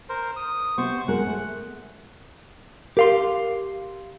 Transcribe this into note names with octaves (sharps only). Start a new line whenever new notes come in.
A#4 C5
D#6
C3 B3 C5 C#6
G#3 A#4 F#5
A3
G4 A#4 F5 C6